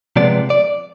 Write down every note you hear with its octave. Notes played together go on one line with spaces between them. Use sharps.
C3 F3 G#3 B3 D5
D5